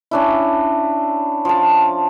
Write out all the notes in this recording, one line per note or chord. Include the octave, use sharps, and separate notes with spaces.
C#4 D4 E4
F3 A5